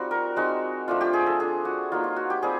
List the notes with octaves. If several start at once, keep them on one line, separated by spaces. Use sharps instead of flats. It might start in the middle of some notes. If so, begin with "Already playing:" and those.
Already playing: G3 C4 D#4 F4 F#4
A#4
G#3 C4 D#4 F#4
F3 A3 D4 F4
G4
G#4
A4
A3 D4 F4 G#4
F#4
F#3 A#3 D#4 F4
F4
F#4
G4
G3 C4 F4 G#4